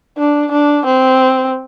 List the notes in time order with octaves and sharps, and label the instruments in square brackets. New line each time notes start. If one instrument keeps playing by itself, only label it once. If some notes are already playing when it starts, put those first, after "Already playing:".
[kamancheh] D4
D4
C4